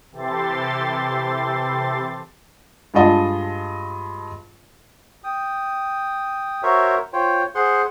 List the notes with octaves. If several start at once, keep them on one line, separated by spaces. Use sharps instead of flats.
C3 E3 G4 A4 C6 A6
G2 G#3 F4 D#5 A5
G5 D#6
F#4 A#4 C5 C#5 E5
F4 C5 C#5 G5
G#4 C5 F#5 C6